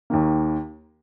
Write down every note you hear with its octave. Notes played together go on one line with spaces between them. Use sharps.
D#2 D#3 A#3